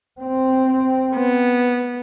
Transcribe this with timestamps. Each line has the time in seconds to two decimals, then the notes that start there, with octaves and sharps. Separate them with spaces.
0.21 C4
1.15 B3